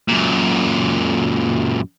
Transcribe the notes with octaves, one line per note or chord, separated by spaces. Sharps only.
F#2 A#2